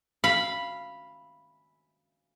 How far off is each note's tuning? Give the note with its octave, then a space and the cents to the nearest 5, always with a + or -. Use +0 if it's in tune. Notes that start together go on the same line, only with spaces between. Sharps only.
F5 -10 B5 -5